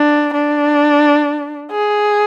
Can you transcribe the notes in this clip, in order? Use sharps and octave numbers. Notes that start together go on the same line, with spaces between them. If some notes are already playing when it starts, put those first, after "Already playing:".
Already playing: D4
D4
G#4